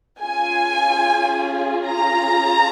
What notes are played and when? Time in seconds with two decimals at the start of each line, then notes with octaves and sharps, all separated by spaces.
0.21 C#4 F4 G#4 G#5
1.86 A#5